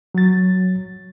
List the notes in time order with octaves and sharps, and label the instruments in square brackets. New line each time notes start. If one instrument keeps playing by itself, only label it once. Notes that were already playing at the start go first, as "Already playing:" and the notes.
[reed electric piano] F#3 A6